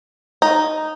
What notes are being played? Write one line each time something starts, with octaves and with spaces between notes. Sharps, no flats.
D#4